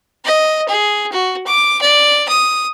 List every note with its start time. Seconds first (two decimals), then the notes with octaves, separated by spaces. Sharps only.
0.24 D#5
0.68 G#4
1.12 F#4
1.47 D6
1.81 D5
2.28 D#6